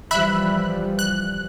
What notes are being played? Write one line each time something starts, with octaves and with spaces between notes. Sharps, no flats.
E3 F3 G3 E5 B5 F#6
F#6